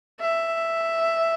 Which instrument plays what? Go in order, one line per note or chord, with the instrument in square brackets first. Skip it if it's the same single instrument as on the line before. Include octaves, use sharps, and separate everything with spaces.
[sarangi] E5